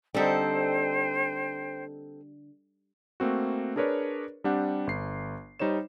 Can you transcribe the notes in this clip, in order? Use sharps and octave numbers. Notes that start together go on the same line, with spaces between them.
D3 G3 C4 D#4 A4 C5 G5
A3 A#3 C4 F#4
D4 G#4 A#4 B4 C#5 D5
G3 C4 D4 G4 F#5
G1 C7
G3 D#4 C5 C#5 E7